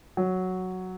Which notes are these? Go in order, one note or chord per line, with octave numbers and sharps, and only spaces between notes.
F#3